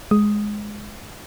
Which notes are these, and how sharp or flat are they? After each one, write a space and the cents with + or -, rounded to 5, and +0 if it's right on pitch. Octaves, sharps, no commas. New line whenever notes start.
G#3 +5 D#6 +0